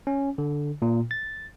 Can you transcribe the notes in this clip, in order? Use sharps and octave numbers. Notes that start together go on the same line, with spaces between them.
C#4
D3
A#2
A6